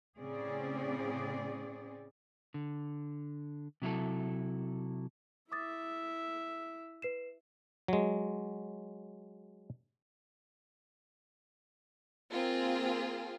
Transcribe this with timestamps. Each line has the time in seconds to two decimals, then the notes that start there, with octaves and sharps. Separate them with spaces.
0.19 A2 C#3 C4 C#4 G#4 D5
2.54 D3
3.82 C3 F#3 E4 A4
5.52 E4 E5 D6 D#6 A6
7.02 B4 C7 E7
7.88 F#3 G#3
12.32 A#3 C4 F4 G#4